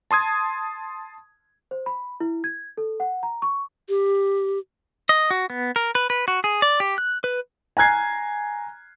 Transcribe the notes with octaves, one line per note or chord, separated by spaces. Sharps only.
A5 C6 D#6 G#6
C5
B5
E4
G#6
A4
F#5
A#5
C#6
G4
D#5
F#4
B3
A#4
B4
B4
F#4
G#4
D5
G4
F#6
B4
G#5 A#5 F#6 G#6 C7